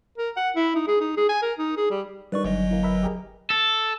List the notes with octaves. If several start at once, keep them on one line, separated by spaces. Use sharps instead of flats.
A#4
F#5
E4
D#4
G#4
D#4
G#4
G#5
A#4
D#4
G#4
G3
G2 D#3 B4 D5 C#6
G1 F#3 D#5
E3 A#3
A#4 B4 E5
G4 G#4 A#4
A4